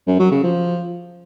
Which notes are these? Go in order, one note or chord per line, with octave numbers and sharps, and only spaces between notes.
F#2
F#3
C#3
F3